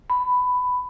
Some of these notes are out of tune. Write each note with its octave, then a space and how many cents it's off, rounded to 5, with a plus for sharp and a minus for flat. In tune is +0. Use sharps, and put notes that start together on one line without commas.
B5 +15